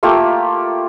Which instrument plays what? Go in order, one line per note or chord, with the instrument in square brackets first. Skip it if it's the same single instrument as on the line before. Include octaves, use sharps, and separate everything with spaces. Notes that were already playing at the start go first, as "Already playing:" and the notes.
[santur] A3 A#3 F4 G4